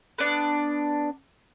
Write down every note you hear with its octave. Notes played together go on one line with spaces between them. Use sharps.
B3 D4